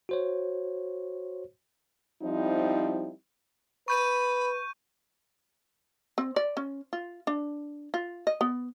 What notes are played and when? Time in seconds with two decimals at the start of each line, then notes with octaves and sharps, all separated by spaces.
0.09 F#4 C5 C#5
2.23 F3 G3 C4 D#4 E4
3.88 B4 B5 C#6 G6 D#7
6.18 C4
6.36 D5
6.57 C#4
6.93 F4
7.27 D4
7.94 F4
8.27 D#5
8.41 B3